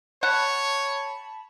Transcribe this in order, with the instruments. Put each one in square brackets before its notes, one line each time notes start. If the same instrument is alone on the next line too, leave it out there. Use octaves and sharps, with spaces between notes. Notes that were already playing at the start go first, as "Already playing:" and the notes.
[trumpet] C#5 [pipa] F#5 [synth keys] A5 B5